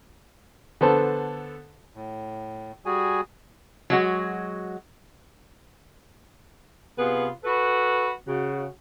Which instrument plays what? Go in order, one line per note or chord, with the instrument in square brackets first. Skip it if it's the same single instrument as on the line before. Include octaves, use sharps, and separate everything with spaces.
[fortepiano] D3 B3 A4 C5 A5
[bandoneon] A2
G3 F#4 G#4 G#5
[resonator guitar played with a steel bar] F#3 G#3 F#4
[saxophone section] C3 B3 F4 G#4 B4
F#4 A4 B4
C#3 F#4